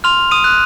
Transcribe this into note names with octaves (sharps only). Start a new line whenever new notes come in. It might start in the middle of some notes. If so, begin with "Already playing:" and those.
C6 F6 F7
D#6 D#7
F#6